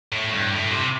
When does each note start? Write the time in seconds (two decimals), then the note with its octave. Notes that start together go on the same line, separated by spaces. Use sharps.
0.12 A2
0.32 G2
0.51 A2
0.71 C3